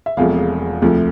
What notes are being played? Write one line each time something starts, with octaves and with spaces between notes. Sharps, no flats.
E5
E1 E2 C3 F3 A3 F5
D2 C3 F3 A3